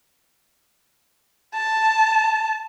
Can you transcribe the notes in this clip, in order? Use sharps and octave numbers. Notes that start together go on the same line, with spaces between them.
A5